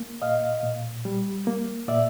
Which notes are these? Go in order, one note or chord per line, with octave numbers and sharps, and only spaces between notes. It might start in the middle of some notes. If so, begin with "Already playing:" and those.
Already playing: A#3
A#2 D#5 F5
A#2
G3
A#3
A#2 D5 E5